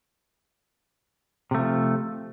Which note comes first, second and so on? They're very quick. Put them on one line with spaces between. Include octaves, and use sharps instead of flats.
C3 A3 F3